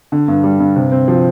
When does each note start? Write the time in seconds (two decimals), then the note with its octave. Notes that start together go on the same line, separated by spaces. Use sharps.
0.12 D3
0.28 G2
0.44 G3
0.60 G2
0.76 C3
0.92 C4
1.08 F3